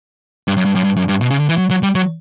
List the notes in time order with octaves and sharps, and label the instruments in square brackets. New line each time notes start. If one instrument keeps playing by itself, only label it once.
[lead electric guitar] G2
F#2
G2
F#2
G2
F#2
G2
B2
C#3
D3
E3
F#3
F#3
G3
F#3